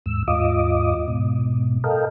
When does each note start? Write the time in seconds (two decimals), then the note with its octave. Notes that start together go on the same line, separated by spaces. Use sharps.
0.06 D#2 G#2 E6
0.28 D#2 G#2 F4 D#5 D6 D#6
1.08 G#2 B2
1.84 A4 A#4 D#5 F5 G5